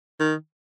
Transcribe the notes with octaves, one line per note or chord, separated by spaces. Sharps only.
D#3